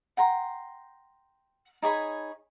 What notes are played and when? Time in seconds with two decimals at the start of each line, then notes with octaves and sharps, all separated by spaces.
0.17 F#5 G5 A#5 C6
1.82 D#4 G#4 C#5 B5